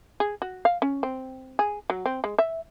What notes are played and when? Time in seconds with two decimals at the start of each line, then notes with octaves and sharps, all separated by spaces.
0.20 G#4
0.42 F#4
0.65 F5
0.82 C#4
1.03 C4
1.59 G#4
1.90 F#3
2.06 C4
2.24 G#3
2.39 E5